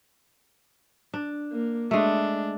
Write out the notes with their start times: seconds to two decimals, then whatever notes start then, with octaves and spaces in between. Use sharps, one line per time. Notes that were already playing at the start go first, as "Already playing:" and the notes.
1.14 D4
1.52 A#3
1.91 G#3 A3 D4